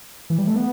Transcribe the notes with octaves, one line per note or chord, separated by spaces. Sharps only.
E3
G3
A3
B3